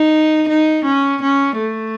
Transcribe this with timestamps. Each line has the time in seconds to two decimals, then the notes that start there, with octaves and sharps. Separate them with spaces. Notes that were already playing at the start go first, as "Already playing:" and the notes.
Already playing: D#4
0.49 D#4
0.85 C#4
1.22 C#4
1.58 A3